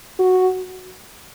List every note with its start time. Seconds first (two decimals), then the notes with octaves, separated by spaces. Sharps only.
0.19 F#4